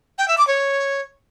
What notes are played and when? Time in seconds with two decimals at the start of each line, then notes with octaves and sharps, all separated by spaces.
0.18 G5
0.28 E5
0.38 D6
0.47 C#5